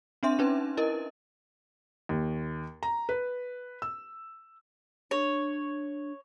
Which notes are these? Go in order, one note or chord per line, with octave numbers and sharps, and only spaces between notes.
C4 D4 E5 C6
C#4 D#4 B4
E4 A#4 D#5
D#2
A#5
B4
E6
D4 C#5